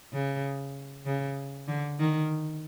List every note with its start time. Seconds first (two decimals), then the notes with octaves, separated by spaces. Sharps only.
0.13 C#3
1.06 C#3
1.68 D3
1.99 D#3